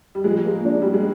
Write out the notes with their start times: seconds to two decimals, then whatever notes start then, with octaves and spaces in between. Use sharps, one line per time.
0.15 G3
0.24 F3 G#3
0.45 A#3
0.65 D4
0.82 G3 F#4
0.94 G#3